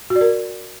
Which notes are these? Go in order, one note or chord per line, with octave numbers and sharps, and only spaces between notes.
F#4
D5
A#4